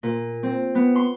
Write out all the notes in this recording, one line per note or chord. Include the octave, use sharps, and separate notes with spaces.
A#2
C4
B3
C6